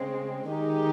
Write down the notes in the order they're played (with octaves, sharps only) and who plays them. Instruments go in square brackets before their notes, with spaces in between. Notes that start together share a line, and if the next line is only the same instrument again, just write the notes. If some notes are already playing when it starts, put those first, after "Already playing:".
Already playing: [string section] C#3 G#3 C4
D#3 G#3 D#4 G4